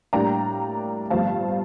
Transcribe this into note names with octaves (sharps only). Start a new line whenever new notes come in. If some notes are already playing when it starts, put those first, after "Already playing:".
A2 G3 A#3 D4 G5 A#5
G1 G2 F3 A3 C4 F5 A5